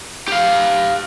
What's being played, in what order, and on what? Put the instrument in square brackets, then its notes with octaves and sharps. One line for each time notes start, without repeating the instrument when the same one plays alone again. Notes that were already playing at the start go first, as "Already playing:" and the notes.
[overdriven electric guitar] G4 F5